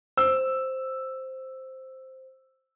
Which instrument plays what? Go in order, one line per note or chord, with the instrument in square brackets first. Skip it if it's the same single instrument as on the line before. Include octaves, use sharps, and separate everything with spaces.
[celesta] C5 [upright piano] E6